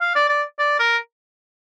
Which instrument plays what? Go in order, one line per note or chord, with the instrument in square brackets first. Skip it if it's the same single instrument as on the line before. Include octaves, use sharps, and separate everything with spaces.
[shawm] F5
D5
D5
D5
A#4